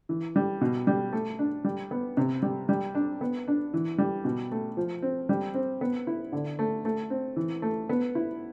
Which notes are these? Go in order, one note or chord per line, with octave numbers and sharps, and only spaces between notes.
E3
G3
B2
G3
A3
D4
G3
B3
C3
G3
G3
D4
B3
D4
E3
G3
B2
A3
F3
C4
G3
C4
B3
E4
D3
A3
A3
C4
E3
A3
B3
E4